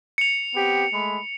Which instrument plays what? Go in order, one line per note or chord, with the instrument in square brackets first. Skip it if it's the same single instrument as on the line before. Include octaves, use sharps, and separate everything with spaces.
[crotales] C#7 F7
[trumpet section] B3 C4 G4
G#3 A3 B5